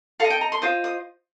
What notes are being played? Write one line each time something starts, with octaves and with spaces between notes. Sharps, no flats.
A4 D#5 F5
G5
A#5
C6
F4 C5 D#5 D#6
D#6